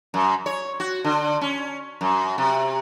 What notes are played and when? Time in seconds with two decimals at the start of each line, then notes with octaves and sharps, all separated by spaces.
0.14 F#2
0.46 C#5
0.80 F#4
1.04 D3
1.41 C#4
2.01 F#2
2.38 C3